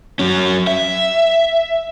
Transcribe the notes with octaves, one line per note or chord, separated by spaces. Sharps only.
F#3 C#4
E5